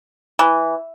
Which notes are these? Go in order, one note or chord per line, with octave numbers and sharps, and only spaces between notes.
E3